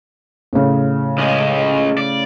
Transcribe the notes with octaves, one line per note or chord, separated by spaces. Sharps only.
A2 C#3
C#2 G#3
D5